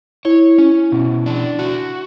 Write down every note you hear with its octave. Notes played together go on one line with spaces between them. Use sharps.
E4 C#5
C#4
B2
D4
F#4